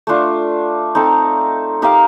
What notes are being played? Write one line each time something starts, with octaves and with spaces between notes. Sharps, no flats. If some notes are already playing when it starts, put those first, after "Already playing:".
A3 D4 F4
C4 D#4 A4
D#4 G4 A#4 F5